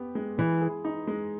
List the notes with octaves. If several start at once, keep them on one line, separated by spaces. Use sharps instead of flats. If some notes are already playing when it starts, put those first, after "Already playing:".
Already playing: B3 G4
G#3
E3 G#3
G#4
D#4
G#3